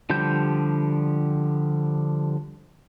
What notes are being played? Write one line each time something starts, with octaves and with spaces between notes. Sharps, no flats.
D3 F3 G3 G4 G6